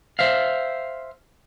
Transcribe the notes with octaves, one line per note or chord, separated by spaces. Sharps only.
C5 E5 F5